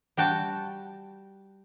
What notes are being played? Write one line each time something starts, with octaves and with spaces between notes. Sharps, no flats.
G3 F#4 G5 A5